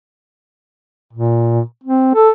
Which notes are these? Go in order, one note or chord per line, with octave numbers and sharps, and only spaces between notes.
A#2
C4
A4